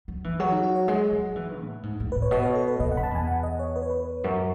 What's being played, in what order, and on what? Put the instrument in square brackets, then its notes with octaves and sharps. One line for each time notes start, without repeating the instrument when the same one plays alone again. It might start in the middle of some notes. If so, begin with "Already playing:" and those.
[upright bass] F#3
E3
[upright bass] F#3 [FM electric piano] G#4
[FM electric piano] D#4
F#4
C#5
[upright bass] G#3 [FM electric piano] F#5
[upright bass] F#3
E3
A2
G#2
A2
[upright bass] A2 [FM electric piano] B4
[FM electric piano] C#5
[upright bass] B2 [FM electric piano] D#5
[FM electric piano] C#5
A4
B4
[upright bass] B2 [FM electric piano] D#5
[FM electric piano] F#5
[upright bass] F#2 [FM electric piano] B5
[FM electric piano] A5
[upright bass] E2 [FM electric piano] G#5
[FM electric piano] F#5
D#5
C#5
B4
C#5
B4
[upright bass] F#2